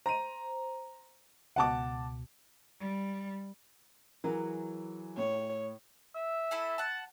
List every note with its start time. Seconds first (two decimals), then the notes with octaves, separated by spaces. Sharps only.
0.06 C5 A#5 D#7
1.56 C#2 B2 F#5 A5 D6
2.80 G3
4.24 E3 F#3 G#4 A#4
5.17 A2 C#5
6.15 E5
6.51 E4 A4 G#5
6.78 F#5 A5